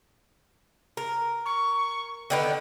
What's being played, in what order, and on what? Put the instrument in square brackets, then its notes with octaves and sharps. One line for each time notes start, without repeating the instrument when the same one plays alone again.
[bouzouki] A#4
[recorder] C#6
[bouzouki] D3 D#3 B3 [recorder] G5